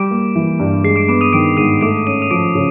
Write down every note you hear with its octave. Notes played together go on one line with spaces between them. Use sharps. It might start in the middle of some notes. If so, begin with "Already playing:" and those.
Already playing: G3 D6 D7
A#3
E3
G2
G#3 C7
D6 D7
B3 D6 D7
D#6 D#7
D#3 D6 D7
G#2 D#6 D#7
A3 D6 D7
C#4 D#7
D#6 D#7
F3 D6 D7
C#3